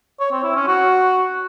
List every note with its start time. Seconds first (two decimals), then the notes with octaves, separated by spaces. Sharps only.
0.20 C#5
0.32 C4
0.44 E4
0.55 C#4
0.67 F#4